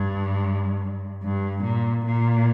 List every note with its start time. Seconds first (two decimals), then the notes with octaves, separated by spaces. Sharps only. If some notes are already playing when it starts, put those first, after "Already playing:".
Already playing: G2
1.23 G2
1.64 A#2
2.05 A#2